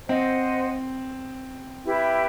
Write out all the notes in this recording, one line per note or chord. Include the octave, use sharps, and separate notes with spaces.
C4 C5 D#5 F#5
E4 G4 B4 E5